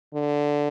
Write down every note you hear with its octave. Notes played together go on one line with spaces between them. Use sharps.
D3